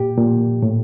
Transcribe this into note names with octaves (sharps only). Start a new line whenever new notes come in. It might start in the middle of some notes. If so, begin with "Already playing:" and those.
Already playing: A#2 G4
A#2
A2